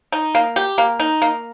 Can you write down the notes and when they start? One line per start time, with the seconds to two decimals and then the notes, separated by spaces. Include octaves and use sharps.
0.12 D#4
0.35 A#3
0.56 G4
0.78 A#3
1.00 D#4
1.22 A#3